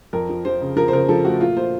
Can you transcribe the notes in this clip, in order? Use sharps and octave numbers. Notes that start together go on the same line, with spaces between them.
F2 A#4
F3
F3 C5
C#3
F3 A#4
C5
C#3 A#4
F3 A4
A3 F#4
A#2 F4
A#2 C5